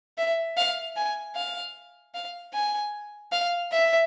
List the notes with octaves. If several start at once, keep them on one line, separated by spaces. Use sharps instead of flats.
E5
F5
G#5
F5
F5
G#5
F5
E5